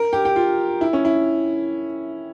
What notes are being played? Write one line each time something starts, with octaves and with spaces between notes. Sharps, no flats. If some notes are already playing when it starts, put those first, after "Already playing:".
Already playing: A#4
G4
G4
F4
E4
C#4
E4